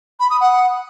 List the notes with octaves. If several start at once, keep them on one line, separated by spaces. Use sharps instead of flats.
B5
D#6
F#5